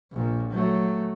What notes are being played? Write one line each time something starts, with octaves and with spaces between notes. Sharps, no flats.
A#1 A#2
F#3 A3